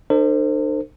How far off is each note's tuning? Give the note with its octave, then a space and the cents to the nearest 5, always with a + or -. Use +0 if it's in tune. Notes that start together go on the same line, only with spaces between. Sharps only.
D4 +45 A4 +45 C5 +0